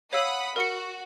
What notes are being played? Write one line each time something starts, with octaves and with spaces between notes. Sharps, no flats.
C#5 F5 F#5 B5 D#6 E6
F#4 A#4 C#7